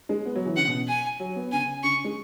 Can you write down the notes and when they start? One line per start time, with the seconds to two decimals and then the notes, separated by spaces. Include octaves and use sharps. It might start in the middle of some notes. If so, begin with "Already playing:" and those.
0.09 G#3
0.26 B3
0.36 F#3
0.46 E3
0.56 C#3 F#5
0.67 B2
0.88 G#5
1.20 F#3
1.36 B3
1.52 C#3 G#5
1.83 C#3 C#6
2.04 G#3